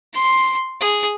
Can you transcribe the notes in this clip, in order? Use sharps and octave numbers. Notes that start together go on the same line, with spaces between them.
C6
G#4